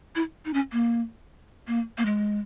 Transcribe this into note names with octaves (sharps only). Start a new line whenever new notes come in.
E4
D#4
C#4
A#3
A#3
A#3
G#3